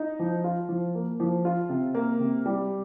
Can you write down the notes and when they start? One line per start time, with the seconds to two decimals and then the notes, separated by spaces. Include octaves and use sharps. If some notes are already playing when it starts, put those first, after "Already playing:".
Already playing: D#4
0.19 F3
0.44 F4
0.69 F3
0.95 A#3
1.20 F3
1.45 F4
1.69 C3
1.95 A#3
2.20 C3
2.46 G3